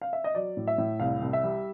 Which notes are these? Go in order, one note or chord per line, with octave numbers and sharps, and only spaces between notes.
F5
E5
D#5
F#3 D5
A2
E5
A2
C2 F5
C2
E5
G3